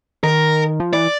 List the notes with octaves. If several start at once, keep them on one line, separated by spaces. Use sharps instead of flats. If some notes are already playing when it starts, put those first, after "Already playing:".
D#3 A#4
F3
E3 D5